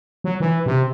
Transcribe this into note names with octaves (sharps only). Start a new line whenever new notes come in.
F#3
E3
C3